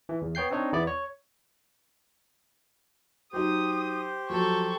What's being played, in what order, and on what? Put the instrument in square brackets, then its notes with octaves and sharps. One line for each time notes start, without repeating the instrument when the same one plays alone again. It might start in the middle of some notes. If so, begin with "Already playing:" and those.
[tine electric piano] E3
E2
B3 C#5 G5 G6 C7
C4 D4 D#4 C#5
E2 B3 E4 D5
C#5
[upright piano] F#3 D#4 [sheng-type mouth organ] G4 C5 [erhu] D#6
[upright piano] F3 F#3 [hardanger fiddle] A4 [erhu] C#6